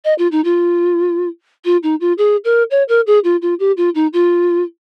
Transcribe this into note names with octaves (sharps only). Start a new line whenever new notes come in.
D#5
F4
D#4
F4
F4
D#4
F4
G#4
A#4
C#5
A#4
G#4
F4
F4
G4
F4
D#4
F4